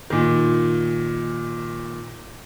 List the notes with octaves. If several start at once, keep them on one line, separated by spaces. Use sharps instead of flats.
A#2 D#3